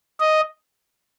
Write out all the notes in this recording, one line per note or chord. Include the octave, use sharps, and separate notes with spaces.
D#5